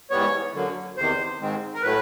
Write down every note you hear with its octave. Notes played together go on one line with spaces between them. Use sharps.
G#2 E3 G3 B3 C#5
F#2 D3 F#3 A#3
E2 C3 D#3 C5
G#2 D#3 G#3 C4
A#4
A2 F#3 A3 B4